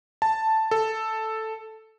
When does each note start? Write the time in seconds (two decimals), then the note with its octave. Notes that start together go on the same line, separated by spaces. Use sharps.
0.22 A5
0.71 A4